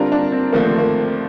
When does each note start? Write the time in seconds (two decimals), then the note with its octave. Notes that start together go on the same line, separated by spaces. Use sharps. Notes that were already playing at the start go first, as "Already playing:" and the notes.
Already playing: D3 G3 C4 D4 F4 A#4
0.12 D4
0.32 C4
0.52 D#2 D3 F3 A3 A#3
0.65 C4
0.78 A#3